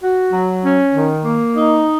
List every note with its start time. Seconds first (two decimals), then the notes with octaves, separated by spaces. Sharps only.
0.01 F#4
0.33 F#3
0.63 C#4
0.94 D#3
1.25 A#3
1.56 D#4